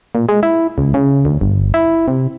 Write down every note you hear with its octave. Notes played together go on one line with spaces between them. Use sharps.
A#2
G#3
E4
C#2
C#3
D2
G1
E4
C3